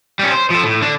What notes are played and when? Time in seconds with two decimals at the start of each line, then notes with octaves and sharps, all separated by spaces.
0.19 G3 C#4
0.31 C5
0.50 F3 A4
0.65 A2
0.82 D3 D4